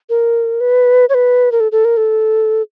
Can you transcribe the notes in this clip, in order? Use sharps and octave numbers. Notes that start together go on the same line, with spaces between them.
A#4
B4
C#5
B4
A#4
A4
A4
A#4
A4